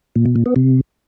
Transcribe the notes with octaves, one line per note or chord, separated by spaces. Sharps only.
A#2
B2
A#2
B3
C3